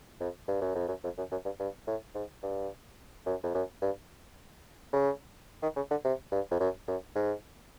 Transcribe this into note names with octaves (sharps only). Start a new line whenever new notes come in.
F2
G2
F#2
F2
F#2
F2
F#2
F#2
G2
G2
A2
G#2
G2
F#2
F2
F#2
G2
C#3
D#3
C#3
D3
C3
G2
F2
F#2
F#2
G#2